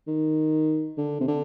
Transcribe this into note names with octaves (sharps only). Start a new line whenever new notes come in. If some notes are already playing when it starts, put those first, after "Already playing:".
D#3
D3
C3
D3